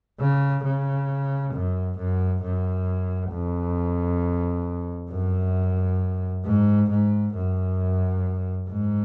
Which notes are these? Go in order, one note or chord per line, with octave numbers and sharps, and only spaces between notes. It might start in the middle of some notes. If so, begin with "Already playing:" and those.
C#3
C#3
F#2
F#2
F#2
F2
F#2
G#2
G#2
F#2
G#2